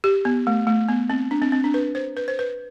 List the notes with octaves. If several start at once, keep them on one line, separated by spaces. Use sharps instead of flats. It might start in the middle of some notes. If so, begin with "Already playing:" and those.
G4
B3
A3
A3
B3
C4
D4
C4
C4
D4
B4
C5
B4
C5
B4